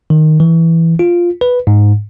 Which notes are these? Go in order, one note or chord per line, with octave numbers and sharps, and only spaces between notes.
D#3
E3
F4
B4
G#2